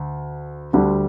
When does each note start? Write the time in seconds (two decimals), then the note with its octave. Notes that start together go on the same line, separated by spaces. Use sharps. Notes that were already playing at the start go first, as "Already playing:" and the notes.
Already playing: D2
0.73 D2 D3 G3